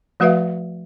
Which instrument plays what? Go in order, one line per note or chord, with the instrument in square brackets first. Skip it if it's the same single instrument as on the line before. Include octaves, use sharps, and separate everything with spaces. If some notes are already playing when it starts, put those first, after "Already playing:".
[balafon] F3 A3 F#4 B4 E5 F5